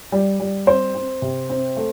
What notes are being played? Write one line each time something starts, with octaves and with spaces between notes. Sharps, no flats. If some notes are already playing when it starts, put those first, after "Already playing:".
G3
G3
C4 C5
C4
C3
C4
A3